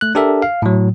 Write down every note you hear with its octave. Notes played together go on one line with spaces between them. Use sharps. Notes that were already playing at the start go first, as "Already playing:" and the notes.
A3 F#6
D4 G4 A4 A#4 E5
F5
A2 F#3